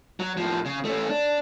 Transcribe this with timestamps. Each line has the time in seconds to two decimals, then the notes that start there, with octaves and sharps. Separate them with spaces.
0.20 F#3
0.37 A2 F3
0.65 C#3
0.85 A3 C#4
1.09 D4